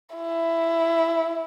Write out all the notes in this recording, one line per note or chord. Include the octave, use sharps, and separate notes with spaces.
E4